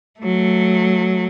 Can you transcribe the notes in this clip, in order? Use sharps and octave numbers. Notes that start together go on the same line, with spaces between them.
F#3 A3